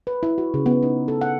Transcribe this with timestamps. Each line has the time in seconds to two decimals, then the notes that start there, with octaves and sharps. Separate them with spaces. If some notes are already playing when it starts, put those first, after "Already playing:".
0.07 B4
0.23 E4
0.38 F#4
0.54 C#3
0.66 B3
0.83 D#4
1.08 A4
1.21 F#5